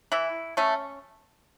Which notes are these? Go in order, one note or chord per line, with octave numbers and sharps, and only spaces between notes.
E3 E4
A3 C#4